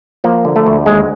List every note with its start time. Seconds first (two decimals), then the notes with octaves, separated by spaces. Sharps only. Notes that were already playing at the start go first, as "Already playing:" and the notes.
0.24 F3 A#3
0.45 D3
0.56 A3
0.66 D2
0.86 D#2 G#3